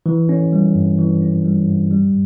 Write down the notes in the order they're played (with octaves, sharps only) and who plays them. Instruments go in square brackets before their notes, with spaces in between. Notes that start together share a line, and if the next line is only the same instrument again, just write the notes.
[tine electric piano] E3
C#4
G3
G2
E3
C#4
G3
G2
G3